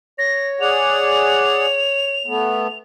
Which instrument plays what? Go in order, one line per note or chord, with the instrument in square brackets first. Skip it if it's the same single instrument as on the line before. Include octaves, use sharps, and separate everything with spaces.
[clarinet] C#5 [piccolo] A#6
[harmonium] G#4 D5 F#5 [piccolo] F7
[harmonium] A3 B3